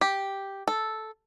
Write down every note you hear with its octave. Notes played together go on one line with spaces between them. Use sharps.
G4
A4